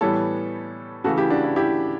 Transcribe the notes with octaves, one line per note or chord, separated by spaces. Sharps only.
A2 E3 G3 B3 A4 C#5
C#3 E3 A3 F#4 A4
E4 G4
D4 F#4
E4
E4 G4